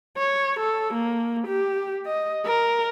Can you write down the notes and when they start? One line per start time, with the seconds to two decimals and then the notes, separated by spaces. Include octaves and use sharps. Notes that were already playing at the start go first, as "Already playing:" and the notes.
0.17 C#5
0.60 A4
0.94 A#3
1.47 G4
2.06 D#5
2.46 A#4